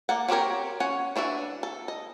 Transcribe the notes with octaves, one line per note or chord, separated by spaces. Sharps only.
A#3 D5 F#5
F#3 C4 G4 A#4 C#5
C#4 C#5 F#5
E3 D4 F#4 E5
A4
D#5